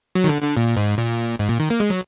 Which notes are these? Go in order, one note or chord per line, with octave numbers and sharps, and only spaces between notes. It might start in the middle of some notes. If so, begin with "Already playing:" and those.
F#3
D#3
D3
D3
A#2
G#2
A#2
G#2
A#2
D#3
A#3
G#3
F#3